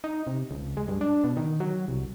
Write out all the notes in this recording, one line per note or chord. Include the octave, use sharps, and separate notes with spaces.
D#4
C3
C#2
G#3
G2
D4
B2
D#3
F#3
C2